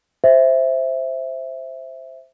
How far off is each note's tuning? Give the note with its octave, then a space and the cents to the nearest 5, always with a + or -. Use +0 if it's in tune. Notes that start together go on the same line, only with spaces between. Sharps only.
C5 +0 E5 +0